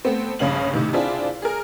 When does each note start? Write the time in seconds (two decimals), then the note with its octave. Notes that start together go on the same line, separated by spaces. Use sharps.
0.05 A3 B3 C4
0.39 A#1 G2 C#3 C#4 F5 F#7
0.73 A2 C3 D#3
0.93 C4 D4 E4 F4 G#4
1.42 G#4 A#4